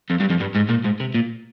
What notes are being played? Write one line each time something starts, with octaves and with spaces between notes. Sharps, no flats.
F2
G2
F2
G2
G#2
A#2
G#2
C3
A#2